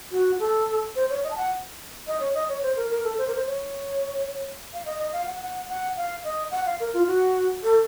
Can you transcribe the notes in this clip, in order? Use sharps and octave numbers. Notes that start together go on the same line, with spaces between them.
F#4
A4
C5
C#5
D#5
A5
F#5
D#5
C#5
D#5
C#5
C5
A#4
A#4
A4
C5
A#4
C5
C#5
F5
D#5
D#5
F5
F#5
F#5
F#5
F5
D#5
F#5
F5
A#4
F4
F#4
A4